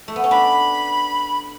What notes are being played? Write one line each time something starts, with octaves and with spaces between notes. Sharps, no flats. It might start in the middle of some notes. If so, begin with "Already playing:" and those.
A3
B3
C#4
D4 B5